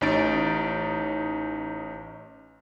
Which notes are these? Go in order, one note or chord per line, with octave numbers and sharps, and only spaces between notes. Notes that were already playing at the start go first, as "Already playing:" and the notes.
A1 C#4 D#4 A6 D7